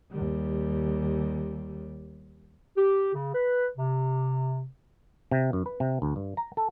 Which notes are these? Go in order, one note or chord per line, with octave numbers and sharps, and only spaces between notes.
D#2 G3
G4
C#3
B4
C3
C3
F#2
B4
C3
D2
G2
A#5
A4